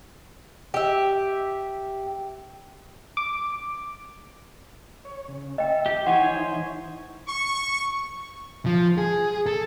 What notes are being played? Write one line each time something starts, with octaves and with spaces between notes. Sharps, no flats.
G4 E5
D6
C#5
C#3
D#5 E5 G5
G4
E3 D#4 C5 C#5 F#5 G#5
C#6
F3
G#4
A4